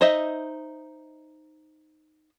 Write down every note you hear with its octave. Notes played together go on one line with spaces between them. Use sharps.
D#4 C5 D#5 E5